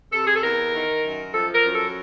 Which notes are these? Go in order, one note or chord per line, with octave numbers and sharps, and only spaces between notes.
C3 A4
G#4
A4
E2 A#4
D#3
F#2
F3 A4
A#4
F#2
A4